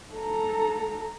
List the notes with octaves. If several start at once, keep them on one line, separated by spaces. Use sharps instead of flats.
A4 A#5